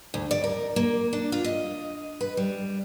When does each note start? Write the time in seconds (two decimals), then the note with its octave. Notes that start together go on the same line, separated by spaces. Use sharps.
0.14 D2
0.31 D5
0.44 A#4
0.76 A#3
1.13 D4
1.32 F4
1.44 D#5
2.21 B4
2.37 G3